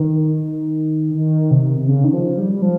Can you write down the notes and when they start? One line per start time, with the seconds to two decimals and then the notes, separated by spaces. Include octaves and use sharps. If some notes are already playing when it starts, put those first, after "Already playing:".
Already playing: D#3
1.15 D#3
1.51 C3
1.79 C3
1.88 C#3
2.04 D#3
2.13 F3
2.38 G3
2.53 G3
2.62 F3